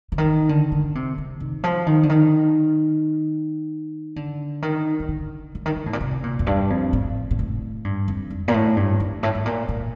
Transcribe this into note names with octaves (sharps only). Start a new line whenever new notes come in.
D3
D#3
D3
D3
C3
C3
D#3
F3
D#3
D3
D#3
D3
D#3
D#3
D3
D3
D#3
D3
A2
A#2
C3
A#2
F2
G2
F2
A2
A#2
A2
G2
F2
G2
A#2
A2
G2
G2
A2
A2
A#2
A#2